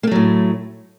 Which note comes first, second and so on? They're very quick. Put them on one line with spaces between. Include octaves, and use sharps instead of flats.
A#3 A3 F#3 A2